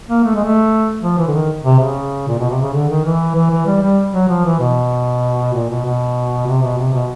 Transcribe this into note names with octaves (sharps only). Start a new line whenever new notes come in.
A#3
A3
G#3
A3
F3
E3
D3
D#3
C3
C#3
A#2
B2
C3
C#3
D3
D#3
E3
E3
E3
G3
G3
F#3
F3
E3
B2
A#2
B2
B2
C3
B2
C3
B2